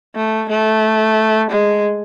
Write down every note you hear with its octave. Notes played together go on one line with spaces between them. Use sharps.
A3
A3
G#3